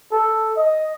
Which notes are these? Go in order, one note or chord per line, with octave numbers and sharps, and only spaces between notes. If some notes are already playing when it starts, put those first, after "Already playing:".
A4
D#5